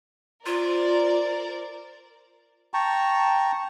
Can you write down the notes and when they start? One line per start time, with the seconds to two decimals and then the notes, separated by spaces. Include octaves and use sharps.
0.46 F4 A#4 C5 D5
2.74 G5 A5 A#5 C#6